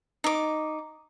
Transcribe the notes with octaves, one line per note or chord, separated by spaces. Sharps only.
D#4 D6